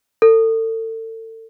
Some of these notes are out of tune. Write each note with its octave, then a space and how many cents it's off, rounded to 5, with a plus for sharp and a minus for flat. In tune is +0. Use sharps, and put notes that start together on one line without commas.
A4 +35